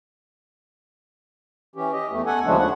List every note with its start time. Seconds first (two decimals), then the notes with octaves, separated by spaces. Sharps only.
1.76 E3 C#4 G4
1.93 G4 D#5
2.11 E2 A3
2.26 A4 F#5 G#5
2.45 D#2 C#3 F3 G#3 A3 D4
2.59 F#5